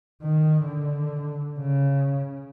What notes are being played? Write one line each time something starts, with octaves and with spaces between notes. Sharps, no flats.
D#3
D3
C#3